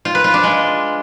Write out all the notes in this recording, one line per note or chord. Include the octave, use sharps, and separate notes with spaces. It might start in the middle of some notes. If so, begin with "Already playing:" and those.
F4
B4
F4
D4
G#3